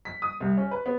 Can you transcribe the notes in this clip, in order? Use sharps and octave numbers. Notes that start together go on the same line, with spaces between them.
B6
D#6
C2
C#4
B4
B3